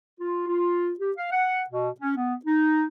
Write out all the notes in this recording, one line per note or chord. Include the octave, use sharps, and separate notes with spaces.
F4
F4
G4
F5
F#5
B2
C#4
B3
D#4